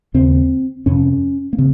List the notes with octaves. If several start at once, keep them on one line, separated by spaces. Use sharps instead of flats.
D#2 C#3 C4
F2 C3 C#4
A#3
C#3 C4